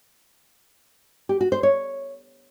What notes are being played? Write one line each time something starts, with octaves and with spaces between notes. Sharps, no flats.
G4
F#4
C5
C#5